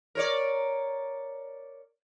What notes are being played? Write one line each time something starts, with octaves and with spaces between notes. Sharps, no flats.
A#4 C#5 D5